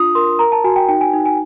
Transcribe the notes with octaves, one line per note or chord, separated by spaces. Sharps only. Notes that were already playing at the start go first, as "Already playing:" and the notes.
Already playing: D4 F4 D#6
A#4 C6
A#4 A#5
A5
F#4 G#5
G5
D#4 G5
G#5
D#4
G#5